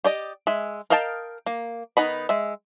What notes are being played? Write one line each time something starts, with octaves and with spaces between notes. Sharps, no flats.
G4 D5 D#5
G#3 E5
A#4 D#5 F5 G5 A5
A#3
D#3 B3 D#4 B5
G#3 E5